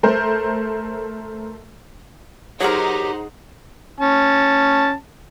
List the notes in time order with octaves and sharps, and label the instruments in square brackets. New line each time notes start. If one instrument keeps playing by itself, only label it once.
[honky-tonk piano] A3 A#4 C5
[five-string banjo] F#3 A#4 [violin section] D#4 C5 F#5 [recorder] G4 [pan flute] G#4
[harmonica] C#4 A5